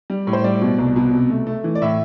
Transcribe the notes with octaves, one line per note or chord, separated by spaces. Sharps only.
G3
A2
C5
G3 D5
B2
C2
B2
C3
A3
A3
E3
D5
A2 E5